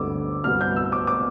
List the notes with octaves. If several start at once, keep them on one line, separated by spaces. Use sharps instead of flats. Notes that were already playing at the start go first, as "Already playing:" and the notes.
Already playing: D2 D3 G3 B3 D6 E6
C2 B2 G3 B3 F6
G6
E6
D6
D6